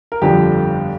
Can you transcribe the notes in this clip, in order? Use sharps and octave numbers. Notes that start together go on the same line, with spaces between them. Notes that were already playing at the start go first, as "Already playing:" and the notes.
A#4
G1 F2 D3 F3 G4